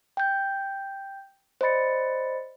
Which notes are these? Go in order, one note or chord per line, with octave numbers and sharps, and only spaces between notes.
G5 G6
C5 D5 D#5 B5 A6 C#7